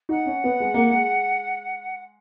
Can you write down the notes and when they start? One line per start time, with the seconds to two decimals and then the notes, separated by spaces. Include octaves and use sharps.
0.09 D#4 F#5
0.26 C#4
0.44 B3
0.60 G#3
0.74 A#3
0.89 G#3